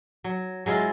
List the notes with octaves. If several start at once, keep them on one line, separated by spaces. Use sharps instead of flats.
F#3
F#3 G#3 E4 F4